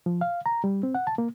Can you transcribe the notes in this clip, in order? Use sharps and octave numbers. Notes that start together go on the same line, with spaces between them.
F3
F5
A#5
G3
C4
F#5
A5
A#3